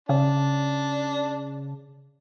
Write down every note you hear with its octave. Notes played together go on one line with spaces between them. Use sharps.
C#3 D4